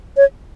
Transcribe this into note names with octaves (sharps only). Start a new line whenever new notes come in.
C#5